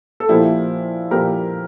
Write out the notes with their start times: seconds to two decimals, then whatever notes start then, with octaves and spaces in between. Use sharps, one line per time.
0.20 A4
0.29 A#2 F3 A#3 E4 G4
1.11 A#2 F3 A#3 G4 A#4